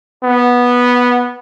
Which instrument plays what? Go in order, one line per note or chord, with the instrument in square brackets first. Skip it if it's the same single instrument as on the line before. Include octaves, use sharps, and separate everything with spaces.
[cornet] B3